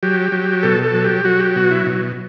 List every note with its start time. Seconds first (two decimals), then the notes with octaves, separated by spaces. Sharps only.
0.03 F#3 G4
0.32 F#3
0.63 B2 A4
0.83 A4
0.94 F#3
1.04 G4
1.25 F#3 F#4
1.40 G4
1.56 B2 F#4
1.70 E4
1.86 B2